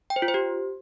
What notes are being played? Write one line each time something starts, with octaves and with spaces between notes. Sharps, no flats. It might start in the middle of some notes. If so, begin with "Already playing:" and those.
G5
C5
F4
C5
G4